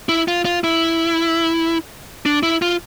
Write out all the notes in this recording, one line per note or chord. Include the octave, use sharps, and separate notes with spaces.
E4
F4
F4
E4
D4
E4
F4